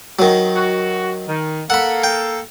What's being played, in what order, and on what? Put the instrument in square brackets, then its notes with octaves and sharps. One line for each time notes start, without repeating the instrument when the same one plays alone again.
[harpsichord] D#3 F#3
[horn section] F#4
D#3
[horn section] A#3 A4 [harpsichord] F#5 B5
[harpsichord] G5